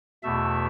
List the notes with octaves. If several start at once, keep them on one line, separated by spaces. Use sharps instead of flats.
E2 B2 A3 E5